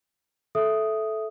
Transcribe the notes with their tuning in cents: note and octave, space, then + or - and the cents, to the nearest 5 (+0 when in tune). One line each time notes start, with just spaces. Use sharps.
A4 -15 E5 +0 D#6 +0